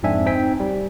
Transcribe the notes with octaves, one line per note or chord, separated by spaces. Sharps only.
F2 G#2 C4 D4 E5 G#5
C4 D#4 G5 G#5 B6
G3